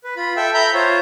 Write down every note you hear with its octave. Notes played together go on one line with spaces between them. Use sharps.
B4
F4 B5
A4 E5 G5 E6
E5 A#5 B5 G6
F4 C5 C#5